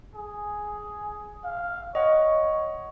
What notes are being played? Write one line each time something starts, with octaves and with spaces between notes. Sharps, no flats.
G#4
F5
C#5 D#5 F#5